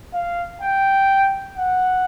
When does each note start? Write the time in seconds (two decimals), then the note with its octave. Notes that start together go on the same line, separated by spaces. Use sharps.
0.14 F5
0.62 G5
1.57 F#5